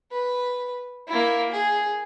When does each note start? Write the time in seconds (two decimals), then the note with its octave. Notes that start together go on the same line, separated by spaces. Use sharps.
0.12 B4
1.08 A#3 E4
1.51 G#4